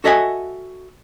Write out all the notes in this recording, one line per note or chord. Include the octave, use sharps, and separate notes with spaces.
F#4 A4 D#5 E5 F#5 G#5